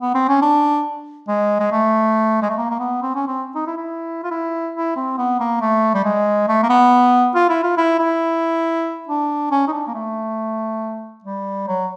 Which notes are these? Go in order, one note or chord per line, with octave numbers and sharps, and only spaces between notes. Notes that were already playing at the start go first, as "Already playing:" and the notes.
B3
C4
C#4
D4
G#3
G#3
A3
G#3
A3
A#3
A#3
B3
C4
C#4
C4
D#4
E4
E4
F4
E4
E4
C4
B3
A#3
A3
G3
G#3
A3
A#3
B3
F4
E4
F4
E4
E4
D4
C#4
D#4
D4
A#3
A3
G3
F#3